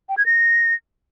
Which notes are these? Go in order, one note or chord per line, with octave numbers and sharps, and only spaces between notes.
G5
G#6
A#6